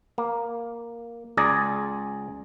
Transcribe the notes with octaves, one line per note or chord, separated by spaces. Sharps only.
A#3
C#2 G#4 D5 A#5